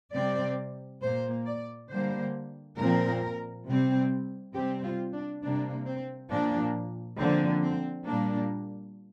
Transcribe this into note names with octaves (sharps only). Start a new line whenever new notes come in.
C3 G3 C4 D5
A#2 A#3 C5
D5
D3 G3 A#3 C5
A#2 F3 C4 A#4
C3 G3 C4
C3 G3 C4 G4
F4
D4
C3 G3 A#3 D4
C4
A#2 F3 A#3 D4
D3 F3 A#3 C4
C4
A#2 G3 A#3 D4